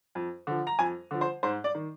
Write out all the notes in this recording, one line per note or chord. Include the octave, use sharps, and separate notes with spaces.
F2
D3 F3
A#5
F2 G#5
D3 F3
C5
G#2 C5
D5
D#3